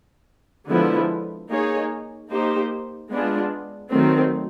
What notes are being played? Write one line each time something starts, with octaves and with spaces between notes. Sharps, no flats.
D3 F3 G#3 B3 E4
A#3 D#4 G#4 C#5
A#3 D#4 G4 C5
G#3 B3 D4 F4 G#4
D#3 F#3 A3 C4